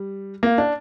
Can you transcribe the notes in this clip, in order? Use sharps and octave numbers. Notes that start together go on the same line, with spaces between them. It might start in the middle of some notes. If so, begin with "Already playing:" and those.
Already playing: G3
A#3
D4